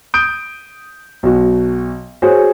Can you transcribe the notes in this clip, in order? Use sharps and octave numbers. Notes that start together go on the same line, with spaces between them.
D#6 G6 D7
B1 F#4
F#4 G#4 C5 C#5